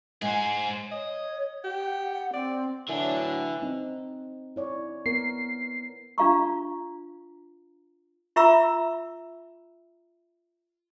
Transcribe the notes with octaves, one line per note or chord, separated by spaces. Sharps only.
G#2 G#4 C5 G#5
C#5 D#5
G4 F#5
C4 D5
A2 D3 E3 F#3 D4
C4 D#4
E4 C#5 D5
B3 A#4 C7
D4 F4 F5 A#5 C#6
F4 E5 A#5 B5 C#6 E6